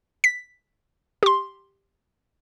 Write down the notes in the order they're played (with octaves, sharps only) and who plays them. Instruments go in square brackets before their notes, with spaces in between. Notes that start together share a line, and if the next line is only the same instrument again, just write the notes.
[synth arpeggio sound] B6
G4 C6